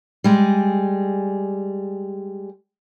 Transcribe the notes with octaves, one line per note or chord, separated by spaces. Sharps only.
G3 G#3 G#4